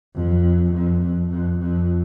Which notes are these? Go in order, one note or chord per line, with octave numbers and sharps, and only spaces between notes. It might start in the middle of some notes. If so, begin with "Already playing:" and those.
F2
F2
F2
F2
F2